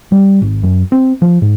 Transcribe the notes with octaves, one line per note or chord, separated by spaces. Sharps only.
G3
G#1
F#2
C4
F3
G#2